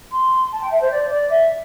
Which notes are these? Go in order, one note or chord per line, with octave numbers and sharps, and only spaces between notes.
C6
A5
G5
E5
C5
D5
D5
E5